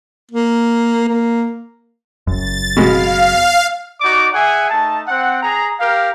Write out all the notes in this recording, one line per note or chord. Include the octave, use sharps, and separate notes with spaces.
A#3
A#3
F#1 F#2 A6
B2 G#3 F5
D#4 F#4 D5 D6
G#4 E5 F#5 G#5
A3 D#4 A5
C4 F#5
G#4 A#5
G4 A#4 F5